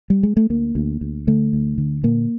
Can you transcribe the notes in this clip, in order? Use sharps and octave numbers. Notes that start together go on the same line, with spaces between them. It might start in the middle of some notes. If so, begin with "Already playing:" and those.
G3
G#3
A3
D2 A#3
D2
D2
D3 A3
D2
D3
A#2 A#3